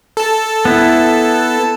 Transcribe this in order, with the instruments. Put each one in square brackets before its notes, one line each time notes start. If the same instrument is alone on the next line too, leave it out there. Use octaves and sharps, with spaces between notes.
[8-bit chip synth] A4 A5
[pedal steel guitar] B3 E4